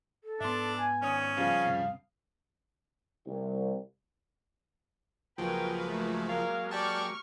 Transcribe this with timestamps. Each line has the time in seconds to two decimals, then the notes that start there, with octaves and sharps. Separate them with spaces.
0.24 A4
0.40 G#2 B3 D4 E5 C6
0.77 G#5
1.02 G#1 C#4 C#5 D#6
1.37 C#3 F3 G3 F5
1.65 D1 G2 C3
3.27 C2
5.38 C#2 F3 F#3 G#3 A#3 A#4 B4 G5
5.88 A3
6.29 A#4 F5
6.71 G4 D5 G5 A5 C#6 F6